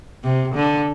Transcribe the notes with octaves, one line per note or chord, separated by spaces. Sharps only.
C3
D3